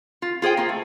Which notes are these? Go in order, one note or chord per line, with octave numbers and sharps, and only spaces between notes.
F4
F4 G#4 C5 G5
A#3 F4
A3